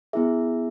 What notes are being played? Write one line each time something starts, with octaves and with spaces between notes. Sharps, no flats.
B3 E4 G#4 E5